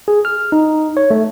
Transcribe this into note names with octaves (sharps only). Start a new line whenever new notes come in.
G#4
F6
D#4
C#5
A3